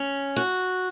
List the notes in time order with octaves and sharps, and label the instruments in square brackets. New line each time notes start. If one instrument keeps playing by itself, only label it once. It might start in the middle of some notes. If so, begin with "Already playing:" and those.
Already playing: [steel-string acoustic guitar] C#4
F#4